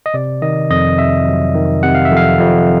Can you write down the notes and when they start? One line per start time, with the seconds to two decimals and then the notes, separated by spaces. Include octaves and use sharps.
0.06 D#5
0.14 C3 D5
0.42 D#3 D#5
0.70 F2 D#5
0.98 C3 E5
1.27 F#3
1.55 D#3
1.83 C3 F#5
1.95 F5
2.05 E5
2.11 F2
2.17 F5
2.39 F2